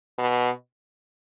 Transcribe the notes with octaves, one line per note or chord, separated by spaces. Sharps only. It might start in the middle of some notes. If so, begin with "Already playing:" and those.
B2